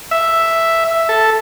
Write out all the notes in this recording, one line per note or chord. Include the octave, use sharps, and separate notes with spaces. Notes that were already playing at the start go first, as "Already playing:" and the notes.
E5
A4